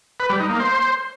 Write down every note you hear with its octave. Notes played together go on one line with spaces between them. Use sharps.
B4
G3
D#4
A#3
C5